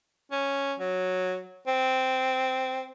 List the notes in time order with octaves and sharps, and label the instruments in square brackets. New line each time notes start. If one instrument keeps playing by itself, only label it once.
[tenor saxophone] C#4
F#3
C4